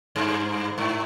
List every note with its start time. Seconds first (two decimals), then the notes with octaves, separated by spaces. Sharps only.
0.16 G2
0.78 G#2